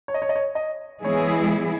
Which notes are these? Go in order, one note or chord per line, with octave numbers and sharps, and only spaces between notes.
C#5
D#5
C#5
D#5
C#5
D#5
E3 G#3 B3 E4 G#4 C#5